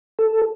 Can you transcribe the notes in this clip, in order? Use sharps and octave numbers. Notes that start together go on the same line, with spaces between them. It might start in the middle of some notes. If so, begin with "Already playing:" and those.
A4